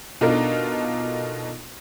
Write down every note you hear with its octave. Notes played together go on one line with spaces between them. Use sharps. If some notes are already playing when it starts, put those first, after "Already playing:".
B2 D4 D#4 F4 A4 A#4